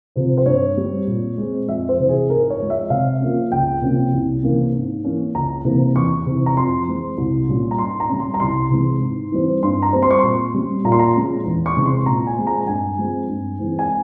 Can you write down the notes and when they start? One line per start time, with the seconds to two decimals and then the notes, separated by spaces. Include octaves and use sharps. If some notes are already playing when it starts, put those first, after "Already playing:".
0.16 C3 F3 C4
0.37 C5
0.46 G2 C#5
0.77 G3 C4
1.07 A#2
1.37 G#3 C4
1.68 F2 E5
1.89 C5
2.00 C3 E3
2.09 G#4
2.29 G#2 A#4
2.50 C#5
2.60 F3 G#3
2.70 E5
2.90 C3 F5
3.21 F3 A#3 C#4
3.51 C#2 G5
3.82 C3 F3 A#3 C#4
4.13 C2
4.43 C3 E3 A#3 C#4
4.74 G#2
5.04 E3 A#3 C#4
5.34 C#2 A#5
5.65 C3 E3 A#3
5.95 E2 C#6
6.26 C3 E3
6.46 A#5
6.57 F2 C6
6.87 E3 G#3 C4
7.17 C2
7.48 A#2 G3 C#4
7.71 A#5
7.78 G#2 C6
8.00 A#5
8.09 G3 C#4
8.20 C6
8.34 A#5
8.40 C2 C6
8.70 C3 E3 G#3
9.01 G#2
9.32 E3 G3 C4
9.63 G2 C6
9.82 A#5
9.93 G3 C4
10.03 C6
10.10 C#6
10.19 A#2 C6
10.54 G3 C#4
10.84 A#2 A#5
10.92 C6
10.99 A#5
11.15 F3 G#3 C#4
11.45 E2
11.66 C#6
11.76 C3 E3 G#3 C#4
11.86 C6
12.06 A#2 A#5
12.27 G#5
12.37 F3 G#3 C4
12.47 A#5
12.67 G2 G#5
12.98 F3 G#3 C4
13.29 G2
13.59 E3 G#3 C4
13.79 G#5